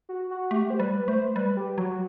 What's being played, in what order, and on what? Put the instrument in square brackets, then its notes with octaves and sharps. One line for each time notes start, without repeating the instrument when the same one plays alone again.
[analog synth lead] F#4
F#4
[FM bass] A3 [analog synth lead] G4
[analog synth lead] C5
[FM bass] G3 [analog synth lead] B4
[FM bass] A3 [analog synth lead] C5
[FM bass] G3 [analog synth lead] B4
[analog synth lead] G4
[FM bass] F#3 [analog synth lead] F#4